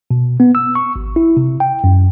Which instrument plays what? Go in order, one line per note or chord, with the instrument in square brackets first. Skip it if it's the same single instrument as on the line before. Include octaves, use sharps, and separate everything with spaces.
[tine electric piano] B2
B3
E6
C#6
G#1
E4
C3
G5
F#2